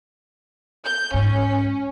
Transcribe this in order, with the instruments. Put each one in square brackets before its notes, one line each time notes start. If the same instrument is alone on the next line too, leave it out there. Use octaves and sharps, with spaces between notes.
[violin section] G6
[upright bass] G#2 [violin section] C#4